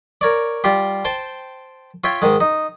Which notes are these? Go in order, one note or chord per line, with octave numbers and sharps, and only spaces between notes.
A#4 C#5 D5
G3 F4 G4
C5 G5 A5
F4 C#5 E5 G5
G#2 D#3 G#3
D#4